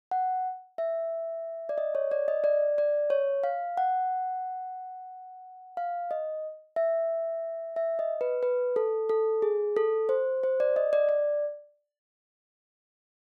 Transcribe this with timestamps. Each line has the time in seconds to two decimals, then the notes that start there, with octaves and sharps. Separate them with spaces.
0.11 F#5
0.78 E5
1.69 D5
1.78 D#5
1.95 C#5
2.11 D5
2.28 D#5
2.44 D5
2.78 D5
3.10 C#5
3.44 F5
3.77 F#5
5.77 F5
6.11 D#5
6.76 E5
7.76 E5
7.99 D#5
8.21 B4
8.43 B4
8.76 A4
9.09 A4
9.42 G#4
9.77 A4
10.09 C5
10.43 C5
10.60 D5
10.76 D#5
10.93 D5
11.09 D5